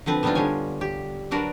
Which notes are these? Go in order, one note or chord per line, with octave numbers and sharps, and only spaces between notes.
D3 F3 C4 B4
G3 B3 C4 D4 D#4 F4
D3 G3 D4 C#5 G#5
G4
F#3 D4 F#4 A#4 B4 D5